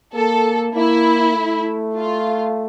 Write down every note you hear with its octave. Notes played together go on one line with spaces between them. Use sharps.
A#3 A4
A#3 E4
A3
F4